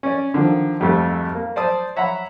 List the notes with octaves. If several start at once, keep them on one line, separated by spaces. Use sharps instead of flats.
C#4 D5
D3 D#3 F3
G#1 F2 G3 A3 G4
A#3
C5 D5 A5 D#6
C#5 E5 F#5 A#5 B5